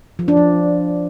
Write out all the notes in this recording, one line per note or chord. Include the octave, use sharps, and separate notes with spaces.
F3
D4
F3